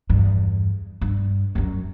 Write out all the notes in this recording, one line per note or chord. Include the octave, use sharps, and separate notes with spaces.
E2 G2
G2
F#2 G3